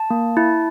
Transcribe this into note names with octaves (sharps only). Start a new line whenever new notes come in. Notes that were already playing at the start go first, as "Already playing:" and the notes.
Already playing: A5
A#3
E4